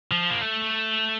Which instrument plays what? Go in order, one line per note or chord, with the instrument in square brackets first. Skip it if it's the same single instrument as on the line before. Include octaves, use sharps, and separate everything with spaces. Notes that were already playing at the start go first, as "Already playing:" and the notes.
[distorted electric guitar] F3
A#3
A3